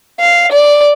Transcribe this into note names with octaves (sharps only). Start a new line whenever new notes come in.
F5
D5